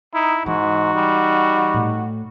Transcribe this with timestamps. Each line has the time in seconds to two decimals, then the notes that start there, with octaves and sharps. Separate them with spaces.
0.14 D#4 E4
0.46 G#2 E3 D#4 F#4
0.95 G3
1.74 A2